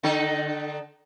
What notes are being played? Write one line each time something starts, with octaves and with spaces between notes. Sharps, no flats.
D3 D#4 A4